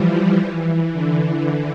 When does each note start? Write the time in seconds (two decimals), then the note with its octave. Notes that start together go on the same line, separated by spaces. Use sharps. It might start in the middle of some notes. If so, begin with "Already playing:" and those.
Already playing: E3 F3 G3
0.36 E3
0.93 D3